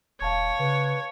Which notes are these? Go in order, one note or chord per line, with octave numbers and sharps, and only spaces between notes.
D#1 C#5 F5 A5 G#6
C#3 B4